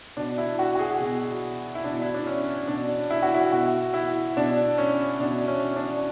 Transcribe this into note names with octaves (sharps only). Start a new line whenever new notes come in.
B2 D4
E4
F#4
F#4
G#4
B2
E4
B2 D4
E4
D4
C#4
B2 D4
E4
F#4
E4
B2 F#4
E4
B2 D4
C#4
B2 D4
C#4
D4